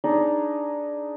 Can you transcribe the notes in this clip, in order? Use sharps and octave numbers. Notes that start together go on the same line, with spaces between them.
D4 D#4 G#4